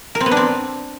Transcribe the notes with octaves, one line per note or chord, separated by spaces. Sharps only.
A#4
C4
B3
D4
C4